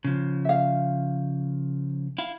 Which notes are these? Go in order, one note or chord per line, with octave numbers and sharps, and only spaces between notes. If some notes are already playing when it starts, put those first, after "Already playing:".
C#3 F3
E5 F5
E4 F5